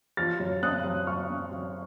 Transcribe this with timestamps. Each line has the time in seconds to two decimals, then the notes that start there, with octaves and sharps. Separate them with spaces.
0.17 F3 F6 A6
0.40 F#2
0.62 C4 D#6 F#6
0.84 F#2
1.07 F#2 C#6 F6
1.29 C4
1.51 F#2